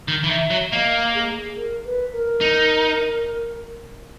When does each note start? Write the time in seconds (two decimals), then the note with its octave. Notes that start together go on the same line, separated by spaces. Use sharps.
0.08 D#3
0.24 E3
0.29 D#3 E5
0.51 F#3
0.72 A#3 D#5
1.15 G#4
1.56 A#4
1.85 B4
2.13 A#4
2.41 D#4